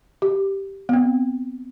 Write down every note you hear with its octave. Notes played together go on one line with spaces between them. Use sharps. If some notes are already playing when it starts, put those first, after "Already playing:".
G4
B3
C4